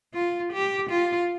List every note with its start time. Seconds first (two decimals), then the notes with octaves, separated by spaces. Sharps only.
0.14 F4
0.53 G4
0.90 F4